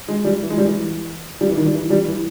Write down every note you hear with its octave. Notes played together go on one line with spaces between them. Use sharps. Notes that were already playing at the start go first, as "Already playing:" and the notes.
G#3
G3
E3
G#3
G3
E3
G3
E3
D#3
G3
E3
G3
E3